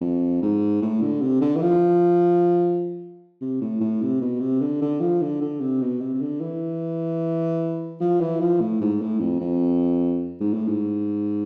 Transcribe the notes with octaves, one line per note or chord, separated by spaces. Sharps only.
F2
G#2
A2
D3
C3
D3
E3
F3
C3
A2
A2
C3
B2
C3
D3
D3
F3
D3
D3
C3
B2
C3
C3
D3
E3
F3
E3
F3
A2
G#2
A2
F2
F2
G#2
A2
G#2